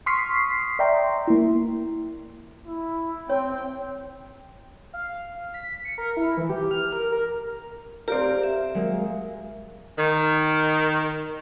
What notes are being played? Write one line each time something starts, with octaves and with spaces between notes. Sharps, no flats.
C6 C#6 D#6 F6 B6 C7
D5 E5 G5 A#5 C6
A#3 E4
E4
C4 C#5 G5
F5
B6
C#7
A#4
E4
E3
G4
F6
A#4
A#4
C4 G4 A#4 D5 F5
E5
F#3 G#3 A#3
D#3